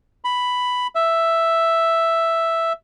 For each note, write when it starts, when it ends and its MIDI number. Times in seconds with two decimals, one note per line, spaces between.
0.24 0.87 83
0.95 2.73 76